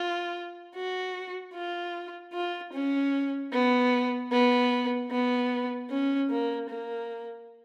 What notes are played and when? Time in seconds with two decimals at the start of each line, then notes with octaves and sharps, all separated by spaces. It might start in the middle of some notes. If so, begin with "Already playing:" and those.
Already playing: F4
0.75 F#4
1.54 F4
2.33 F4
2.73 C#4
3.52 B3
4.31 B3
5.11 B3
5.90 C#4
6.30 A#3
6.69 A#3